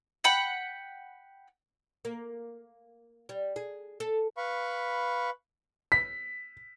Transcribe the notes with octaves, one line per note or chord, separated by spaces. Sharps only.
F#5 G5 B5
A#3
G3
G#4
A4
B4 F5 B5 C#6
B6